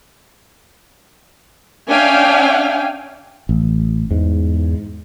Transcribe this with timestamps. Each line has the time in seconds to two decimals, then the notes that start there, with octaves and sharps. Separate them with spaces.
1.89 C#4 D4 E5 F5 G5 G#5
3.49 A1
4.11 E2 G#2